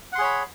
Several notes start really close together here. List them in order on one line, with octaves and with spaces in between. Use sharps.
F#5 C6 G#4 C#5 B5